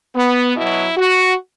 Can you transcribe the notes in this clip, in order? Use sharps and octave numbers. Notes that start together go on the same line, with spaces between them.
B3
B2 F#3 E4
F#4